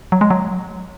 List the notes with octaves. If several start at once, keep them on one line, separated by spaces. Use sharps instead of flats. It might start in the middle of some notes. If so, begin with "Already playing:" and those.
F#3
G#3
F#3